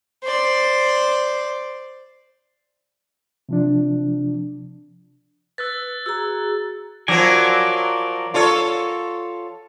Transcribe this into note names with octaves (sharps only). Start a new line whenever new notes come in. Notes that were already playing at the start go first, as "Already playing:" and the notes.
C5 D5
C3 F3 D4
B4 E6 F#6 A6
F#4 G#4 A#5 E6
F3 F#3 A#4 D5 G#5
F4 A4 C#5